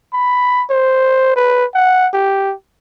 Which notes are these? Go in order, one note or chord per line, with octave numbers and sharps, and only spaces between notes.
B5
C5
B4
F#5
G4